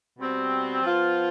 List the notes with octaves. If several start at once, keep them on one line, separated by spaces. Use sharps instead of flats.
B2 G3 C4
F3 B3 F4